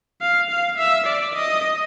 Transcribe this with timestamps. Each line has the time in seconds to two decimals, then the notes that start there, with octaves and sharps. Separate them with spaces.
0.21 F5
0.50 F5
0.78 E5
1.06 D5
1.35 D#5